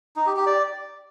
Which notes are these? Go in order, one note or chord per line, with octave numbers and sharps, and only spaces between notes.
D#4
G4
G4
D5